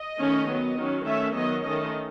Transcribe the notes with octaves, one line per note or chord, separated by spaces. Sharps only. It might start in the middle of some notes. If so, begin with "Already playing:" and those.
Already playing: D#5
D#3 A3 C#4
F#3 B3
D#3 F#3 C#4
D#3 A3 C#4 E5
D#3 F#3 B3 D#5
D#3 A3 C#4 D#5